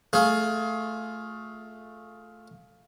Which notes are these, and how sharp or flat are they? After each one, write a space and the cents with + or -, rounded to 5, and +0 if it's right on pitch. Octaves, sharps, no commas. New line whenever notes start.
A3 +0 F4 +10 G#4 +25